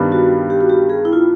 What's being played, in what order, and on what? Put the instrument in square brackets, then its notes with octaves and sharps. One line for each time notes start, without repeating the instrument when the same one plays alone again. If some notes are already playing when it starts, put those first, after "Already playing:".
Already playing: [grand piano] G2 D#3 G3 B3
[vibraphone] F#4
G4
F#4
G4
G#4
E4
F4